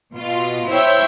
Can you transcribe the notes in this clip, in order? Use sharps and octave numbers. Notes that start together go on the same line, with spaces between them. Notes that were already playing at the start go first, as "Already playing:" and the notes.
B2 F4
E4 C5 C#5 E5 G5